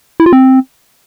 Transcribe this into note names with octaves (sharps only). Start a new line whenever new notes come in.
E4
F4
C4